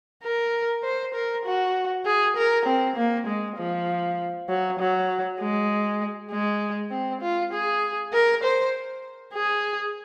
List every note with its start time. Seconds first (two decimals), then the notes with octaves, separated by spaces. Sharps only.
0.23 A#4
0.83 C5
1.14 A#4
1.45 F#4
2.06 G#4
2.36 A#4
2.66 C4
2.96 A#3
3.27 G#3
3.57 F3
4.49 F#3
4.79 F#3
5.40 G#3
6.31 G#3
6.91 C4
7.21 F4
7.52 G#4
8.13 A#4
8.43 C5
9.34 G#4